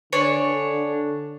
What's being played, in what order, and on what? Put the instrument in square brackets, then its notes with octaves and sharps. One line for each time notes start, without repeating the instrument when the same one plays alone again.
[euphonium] D3 [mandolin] D4 C#5 G#5